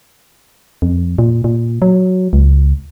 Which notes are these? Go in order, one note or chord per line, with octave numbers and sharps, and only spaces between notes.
F2
A#2
A#2
F#3
C#2